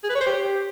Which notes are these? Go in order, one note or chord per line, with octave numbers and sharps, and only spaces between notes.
G#4
B4
C#5
C5
G4